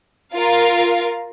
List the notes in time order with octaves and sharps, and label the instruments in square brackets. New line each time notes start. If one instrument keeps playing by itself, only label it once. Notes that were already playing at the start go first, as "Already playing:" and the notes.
[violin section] F4 A#4 F5